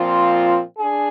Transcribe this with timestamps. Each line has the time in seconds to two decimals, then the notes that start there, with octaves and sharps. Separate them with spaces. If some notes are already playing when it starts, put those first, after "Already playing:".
Already playing: A#2 F3 C4 F4
0.78 D4 G#4